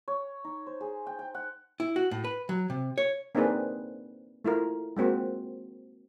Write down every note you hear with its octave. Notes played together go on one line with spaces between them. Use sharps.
C#5
D#4
C5
G#4
G5
G5
F#5
E4
F#4
A2
B4
F#3
C3
C#5
A#3 C4 D4 D#4 G#4 B4
A3 E4 F4 A#4
G#3 A#3 C4 F#4